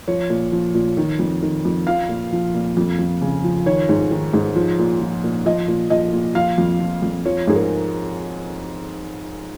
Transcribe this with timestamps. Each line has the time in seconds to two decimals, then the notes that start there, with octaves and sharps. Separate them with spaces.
0.08 F3 C#5
0.30 A#2
0.52 F3
0.74 A#2
0.97 D#3
1.19 F2
1.42 D#3
1.65 F2
1.87 F3 F5
2.09 A#2
2.32 F3
2.54 A#2
2.77 F2
2.99 F2
3.21 C#3
3.44 F3
3.66 D#3 C#5
3.89 G#2
4.11 D#3
4.33 G#2
4.55 F3
4.79 A#2
5.01 F3
5.24 A#2
5.46 F3 D#5
5.68 A#2
5.90 F3 D#5
6.13 A#2
6.35 F3 F5
6.58 F2
6.80 F3
7.02 F2
7.25 F3 C#5
7.47 G#2 G#4
7.55 A#4